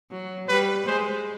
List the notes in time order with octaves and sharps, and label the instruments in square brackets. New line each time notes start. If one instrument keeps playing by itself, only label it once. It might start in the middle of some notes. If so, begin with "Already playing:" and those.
[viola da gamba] F#3
[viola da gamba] G3 [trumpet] B4
[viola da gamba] G#3 [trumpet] C5